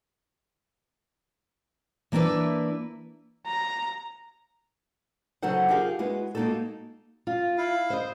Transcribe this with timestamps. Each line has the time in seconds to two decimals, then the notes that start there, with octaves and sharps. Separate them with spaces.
2.12 E3 A#3 B3 D4 E4 B4
3.47 A#5
5.42 C#3 F#3 D#4 A4 C5 F#5
5.69 D#4 F4 G4 G#4 A#4 F5
5.99 G#3 E4 F#4 B4
6.35 G#3 A#3 B3 D#4 F#4 A4
7.27 F4
7.58 E4 F5
7.90 C5 D#5